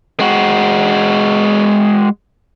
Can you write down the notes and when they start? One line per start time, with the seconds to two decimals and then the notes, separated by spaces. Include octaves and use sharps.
0.20 G#3 F#4